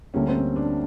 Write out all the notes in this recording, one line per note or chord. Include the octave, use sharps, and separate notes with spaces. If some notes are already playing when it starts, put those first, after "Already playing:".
D2 D3 G3 A#3 C#4
C4
C#4
D4